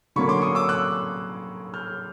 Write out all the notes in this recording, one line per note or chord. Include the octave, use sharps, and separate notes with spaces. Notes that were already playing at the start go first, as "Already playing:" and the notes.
D3 F#3 A#3 C#4 B5 C#6
C6 D6
C#6 D#6
D6 E6
E6 F#6
F6 G6